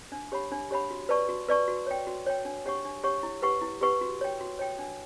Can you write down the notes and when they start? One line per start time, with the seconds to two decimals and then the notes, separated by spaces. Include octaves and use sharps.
0.12 D4
0.32 G4 C#5 F#5 B5
0.52 D4
0.71 G4 C#5 F#5 B5
0.91 F#4
1.09 B4 D5 A5 C#6
1.29 F#4
1.49 B4 D5 A5 C#6
1.68 F#4
1.87 C#5 G5
2.07 F#4
2.26 C#5 G5
2.45 D4
2.66 G4 C#5 F#5 C#6
2.85 D4
3.04 G4 C#5 F#5 C#6
3.23 E4
3.42 G4 B4 F#5 C#6
3.62 E4
3.81 G4 B4 F#5 C#6
4.01 F#4
4.21 C#5 G5
4.41 F#4
4.59 C#5 G5
4.79 D4